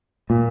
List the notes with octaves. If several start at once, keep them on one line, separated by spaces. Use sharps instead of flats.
A#2